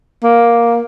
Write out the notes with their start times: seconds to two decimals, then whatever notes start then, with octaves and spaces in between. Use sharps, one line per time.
0.24 A#3